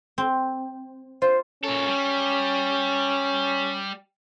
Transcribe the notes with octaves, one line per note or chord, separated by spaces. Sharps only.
C4
F4 C5
A#2 C#4 A4
G3